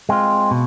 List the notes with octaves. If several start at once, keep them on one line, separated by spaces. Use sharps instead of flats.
G#3 C4 F4
B2